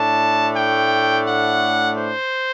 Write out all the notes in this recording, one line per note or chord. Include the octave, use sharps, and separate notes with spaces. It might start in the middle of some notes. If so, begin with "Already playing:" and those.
Already playing: A2 A3 D4 A5
G5
F#5
C5